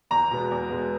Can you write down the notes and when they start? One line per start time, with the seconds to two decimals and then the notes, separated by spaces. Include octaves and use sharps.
0.11 E2 A#5
0.31 B2 G#3 B3
0.51 E2
0.70 B2 G#3 B3